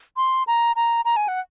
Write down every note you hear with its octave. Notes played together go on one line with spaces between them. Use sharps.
C6
A#5
A#5
A#5
G#5
F#5